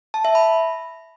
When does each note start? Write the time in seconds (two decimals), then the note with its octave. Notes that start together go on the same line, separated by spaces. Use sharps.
0.14 A5
0.25 E5
0.35 B5